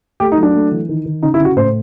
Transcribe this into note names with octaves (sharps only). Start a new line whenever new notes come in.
A3 G4
D#4
F#3
D4
A3
E3
D#3
D#3
C#3 D#4
E4
C#3
F#4
A2 C5